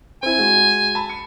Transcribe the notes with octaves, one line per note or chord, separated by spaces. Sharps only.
C4 E4 G#5
G#3 F#4
A5 B5
C#7